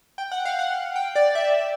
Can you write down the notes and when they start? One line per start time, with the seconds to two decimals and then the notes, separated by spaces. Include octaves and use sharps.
0.18 G5
0.32 F#5
0.45 F5
0.59 F#5
0.96 G5
1.15 D5
1.35 E5